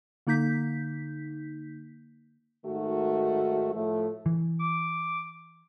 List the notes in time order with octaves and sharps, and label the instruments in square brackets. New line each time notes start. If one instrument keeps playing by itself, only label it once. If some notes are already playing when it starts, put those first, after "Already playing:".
[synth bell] D3 A#3 D#4 G6 B6
[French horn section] G#2 D#3 A3 F#4
A2 F3 A3
[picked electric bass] E3
[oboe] D6